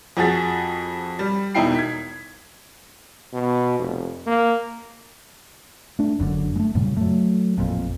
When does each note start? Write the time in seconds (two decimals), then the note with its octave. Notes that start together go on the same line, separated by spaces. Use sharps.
0.17 F2 F3 F#4 G#4 A6 B6
1.19 G3
1.55 E1 B2 D#4 E4 G5 C7
1.75 G#6 B6
3.34 B2
3.79 F1
4.27 A#3
5.99 A3 D4
6.18 F#1 F#2 B2 D3
6.56 G#3 A3
6.75 F#2 A#2 C#3 G3
6.97 F#3 A3
7.58 A1 F2 A#2